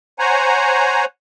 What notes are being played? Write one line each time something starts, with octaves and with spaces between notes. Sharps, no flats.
C5 C#5 F#5 G#5 A#5